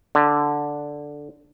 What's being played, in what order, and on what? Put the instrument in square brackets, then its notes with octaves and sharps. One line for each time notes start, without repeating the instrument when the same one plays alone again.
[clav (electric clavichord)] D3